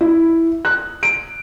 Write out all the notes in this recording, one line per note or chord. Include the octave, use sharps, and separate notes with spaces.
E4
F#6
D7